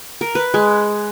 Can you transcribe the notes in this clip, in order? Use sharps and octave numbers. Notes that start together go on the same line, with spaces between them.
A#4
B4
G#3